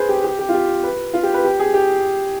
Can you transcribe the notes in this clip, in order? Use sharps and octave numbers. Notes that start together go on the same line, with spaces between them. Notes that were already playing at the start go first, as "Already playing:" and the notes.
Already playing: G#4 B4 C5
G4
G4
G4
F4
G4
B4
F4
G4
B4
G4
G#4
G4